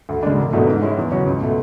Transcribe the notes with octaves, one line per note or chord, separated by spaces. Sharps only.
D2
C#3 G#3 D4
E1
E2 B2 A3 D4
G#2
G#3 C#4 E4
E2
C#3 F#3 C#4 F#4
C#2
B2 A3